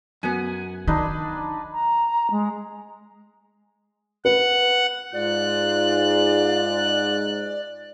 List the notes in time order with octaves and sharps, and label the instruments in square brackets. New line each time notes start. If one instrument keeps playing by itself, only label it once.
[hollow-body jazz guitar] F#2 B3 [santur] F#5 G#5
[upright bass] D#3 [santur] D4 D#4 B4
[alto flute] A#5
G#3
[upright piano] B4 [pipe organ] F#5
[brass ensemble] G#2 [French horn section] F4 [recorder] D5 [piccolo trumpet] F#6